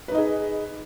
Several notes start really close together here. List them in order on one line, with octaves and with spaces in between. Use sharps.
B4 D#4 D#5 G#4